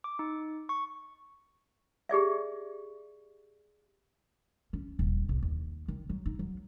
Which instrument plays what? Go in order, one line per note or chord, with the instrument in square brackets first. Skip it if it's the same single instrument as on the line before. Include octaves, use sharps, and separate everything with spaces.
[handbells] D6
D#4
C#6
[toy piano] G4 G#4 D5 E5
[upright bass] C#4
D#1
B1
D#2
D#3
F#3
D#4
F#3